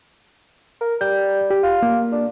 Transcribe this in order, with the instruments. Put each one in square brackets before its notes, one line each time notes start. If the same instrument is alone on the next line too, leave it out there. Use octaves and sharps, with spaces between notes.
[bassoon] A#4
[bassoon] G3 [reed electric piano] G6
[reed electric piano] G4
[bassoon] F4
[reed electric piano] A#3
[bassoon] D4